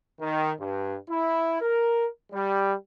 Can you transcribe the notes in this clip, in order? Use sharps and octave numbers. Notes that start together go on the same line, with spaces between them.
D#3
G2
E4
A#4
G3